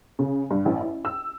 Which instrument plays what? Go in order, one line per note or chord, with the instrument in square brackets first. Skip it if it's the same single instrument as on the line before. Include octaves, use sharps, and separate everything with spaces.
[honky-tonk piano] C#3
G2
A1
E4
E6